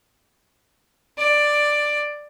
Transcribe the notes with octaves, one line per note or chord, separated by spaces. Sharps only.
D5